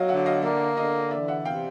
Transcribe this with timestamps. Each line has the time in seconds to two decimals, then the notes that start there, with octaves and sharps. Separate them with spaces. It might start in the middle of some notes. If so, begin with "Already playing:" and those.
Already playing: F#3 D#5 F5
0.09 D3 E5 F#5
0.26 D#5 F5
0.43 A#3 D5 E5
0.77 D3 D#5 F5
1.11 E3 D5 E5
1.28 E5 F#5
1.45 C3 F5 G5